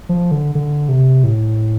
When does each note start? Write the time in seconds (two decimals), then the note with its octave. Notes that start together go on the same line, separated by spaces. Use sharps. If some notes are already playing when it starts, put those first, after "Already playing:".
0.09 F3
0.31 D3
0.55 D3
0.89 C3
1.24 A2